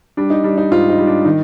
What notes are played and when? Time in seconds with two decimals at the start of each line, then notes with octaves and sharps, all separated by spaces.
0.17 G3 D4
0.30 D#4
0.44 G3 D4
0.57 D#4
0.71 G#2 F4
0.89 D#4
0.98 G3
1.07 D4
1.25 D#3 D#4